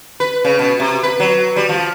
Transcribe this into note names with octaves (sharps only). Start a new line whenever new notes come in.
B4
C#3
B2
C3
B4
F#3
G3
F3